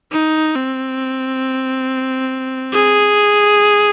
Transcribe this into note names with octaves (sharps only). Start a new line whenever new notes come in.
D#4
C4
G#4